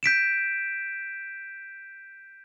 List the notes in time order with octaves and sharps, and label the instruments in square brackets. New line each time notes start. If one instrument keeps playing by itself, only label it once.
[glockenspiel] G6 B6 D7 E7